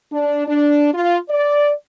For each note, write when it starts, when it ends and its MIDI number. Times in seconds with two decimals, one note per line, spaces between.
0.12 0.43 62
0.46 0.90 62
0.93 1.17 65
1.29 1.72 74